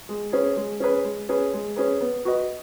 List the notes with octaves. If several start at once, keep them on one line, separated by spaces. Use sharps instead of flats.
G#3
C#4 G#4 B4
G#3
C#4 G#4 B4
G#3
C#4 G#4 B4
G#3
C#4 G#4 B4
B3
F#4 B4 D#5